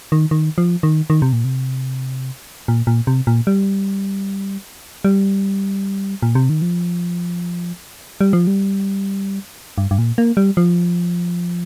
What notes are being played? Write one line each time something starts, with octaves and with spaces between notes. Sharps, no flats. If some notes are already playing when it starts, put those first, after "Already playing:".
D#3
D#3
F3
D#3
D#3
C3
A#2
C3
A#2
A#2
C3
A#2
G3
G3
A#2
C3
D#3
F3
G3
F3
G3
G2
G2
A#2
A#3
G3
F3